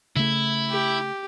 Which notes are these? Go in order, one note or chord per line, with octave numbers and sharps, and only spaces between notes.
C#3 A3 E4
G4